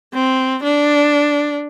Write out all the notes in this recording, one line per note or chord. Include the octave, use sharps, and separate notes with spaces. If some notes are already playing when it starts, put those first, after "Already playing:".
C4
D4